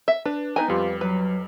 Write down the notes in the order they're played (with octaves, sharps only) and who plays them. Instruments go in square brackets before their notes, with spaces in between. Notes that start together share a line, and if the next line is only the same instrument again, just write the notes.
[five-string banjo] E5
[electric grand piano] D4 [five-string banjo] B4
[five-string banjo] B3 B4 G#5 [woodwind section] D#4 [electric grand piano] G5 A#5
[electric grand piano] F2 G3 [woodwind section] F4 G4
[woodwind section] F#3 [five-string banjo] B4